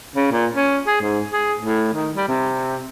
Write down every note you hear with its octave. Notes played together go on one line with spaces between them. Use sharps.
C#3
A#2
C#4
G#4
G#2
G#4
A2
D#3
G3
C3